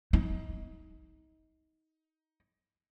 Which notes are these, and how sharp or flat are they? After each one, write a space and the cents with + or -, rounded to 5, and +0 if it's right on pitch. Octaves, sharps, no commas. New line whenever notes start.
D#4 +25